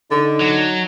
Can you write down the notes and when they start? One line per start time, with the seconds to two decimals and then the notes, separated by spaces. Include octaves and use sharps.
0.11 D3 D#4
0.41 F#3